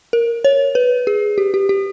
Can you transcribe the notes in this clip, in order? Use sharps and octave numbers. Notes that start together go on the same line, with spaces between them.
A#4
C#5
B4
G#4
G4
G4
G4